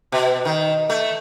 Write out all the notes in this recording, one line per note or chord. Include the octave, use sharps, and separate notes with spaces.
B2
D#3
A3